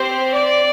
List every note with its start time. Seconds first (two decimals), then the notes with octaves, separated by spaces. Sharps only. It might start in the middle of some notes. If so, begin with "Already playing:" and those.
Already playing: C4 G4 C5
0.35 D5